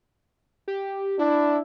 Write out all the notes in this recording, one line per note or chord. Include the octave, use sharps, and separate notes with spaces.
G4
D4 E4